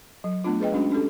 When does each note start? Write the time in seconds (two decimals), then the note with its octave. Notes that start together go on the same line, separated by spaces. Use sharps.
0.24 F#3
0.44 A3 B3 D4 F4
0.60 G#4 B4 D#5 G5
0.73 G#3 C#4 D4 F#4
0.90 C#4 D4 G4 A4